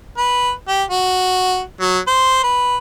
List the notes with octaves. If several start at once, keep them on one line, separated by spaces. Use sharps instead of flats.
B4
G4
F#4
F#3
C5
B4